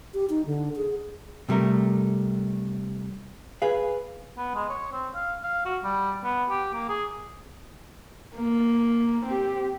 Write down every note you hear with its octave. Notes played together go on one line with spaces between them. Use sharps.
G4
D#4
D3
G#4
C3 G3 A3 A#4
G#4 B4 F5
B3
G#3
C#5
C4
F5
F5
F#4
G3
B3
G4
A#3
G#4
A#3
C4 G4